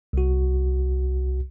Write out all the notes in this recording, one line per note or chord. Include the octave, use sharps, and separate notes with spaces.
C2 F#4